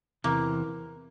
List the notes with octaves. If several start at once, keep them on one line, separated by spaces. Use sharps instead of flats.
E2 C3 E3 A#3